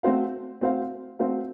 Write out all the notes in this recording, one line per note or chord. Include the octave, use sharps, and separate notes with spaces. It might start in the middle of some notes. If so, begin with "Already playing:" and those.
A3 C4 F#4 C5 F5
A3 C4 F#4 C5 F5
A3 C4 F#4 C5 F5